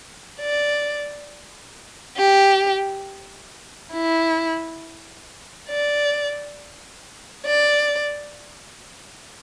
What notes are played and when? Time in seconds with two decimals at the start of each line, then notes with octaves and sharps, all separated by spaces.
0.41 D5
2.17 G4
3.93 E4
5.69 D5
7.46 D5